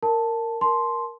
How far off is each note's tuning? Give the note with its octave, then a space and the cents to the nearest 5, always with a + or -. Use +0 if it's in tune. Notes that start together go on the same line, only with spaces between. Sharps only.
A#4 -15 A5 +0
A#4 +10 A5 -25 C6 +0